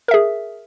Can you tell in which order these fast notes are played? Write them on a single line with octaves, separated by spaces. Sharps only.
A#4 E5 G#4